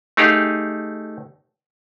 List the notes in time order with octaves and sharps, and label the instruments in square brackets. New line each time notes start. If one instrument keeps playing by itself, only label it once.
[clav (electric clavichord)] A3 D#4 G4 G#4 F5